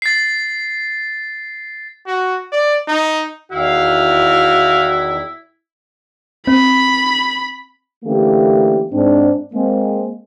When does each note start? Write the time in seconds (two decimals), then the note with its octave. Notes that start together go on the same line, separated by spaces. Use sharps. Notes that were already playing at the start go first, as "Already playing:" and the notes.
0.02 A6 C7
2.07 F#4
2.52 D5
2.88 D#4
3.52 E2 D#3 E4 F#4 F5
6.47 C4 B5
8.04 D3 E3 A3 A#3 C#4 G4
8.92 G#2 C4 D4
9.54 G#3 A#3 C4